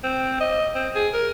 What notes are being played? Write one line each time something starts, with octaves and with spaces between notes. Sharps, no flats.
C4
D#5
C4
G#4
A#4